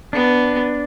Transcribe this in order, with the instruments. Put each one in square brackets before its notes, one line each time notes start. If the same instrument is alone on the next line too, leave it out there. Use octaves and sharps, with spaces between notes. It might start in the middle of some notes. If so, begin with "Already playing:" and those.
[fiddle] B3 [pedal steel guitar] D4